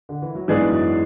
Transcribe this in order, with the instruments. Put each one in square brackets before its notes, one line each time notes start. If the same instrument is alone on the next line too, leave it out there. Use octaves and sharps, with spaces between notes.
[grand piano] D3
E3
F#3
[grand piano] G#2 G#3 [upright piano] E3 B3 D4 G#4 D5
[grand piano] F#2 F#3